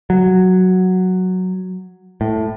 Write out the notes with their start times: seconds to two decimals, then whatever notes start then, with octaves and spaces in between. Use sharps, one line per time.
0.10 F#3
2.21 A2